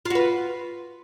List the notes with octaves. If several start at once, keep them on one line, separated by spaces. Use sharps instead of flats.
F4 F#4 B4